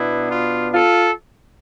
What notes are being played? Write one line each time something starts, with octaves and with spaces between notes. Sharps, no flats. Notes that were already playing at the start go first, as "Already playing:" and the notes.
Already playing: B2 B3 D4 E4
F4
F4 A4